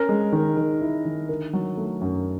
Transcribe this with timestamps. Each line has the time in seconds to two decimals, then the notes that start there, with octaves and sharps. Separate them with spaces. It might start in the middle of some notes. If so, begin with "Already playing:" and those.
Already playing: C#4 A#4
0.09 G#3
0.32 D#3
0.57 D#3
0.81 E4
1.05 D#3
1.29 D3 A#4
1.53 F#3
1.77 A3
2.01 F#2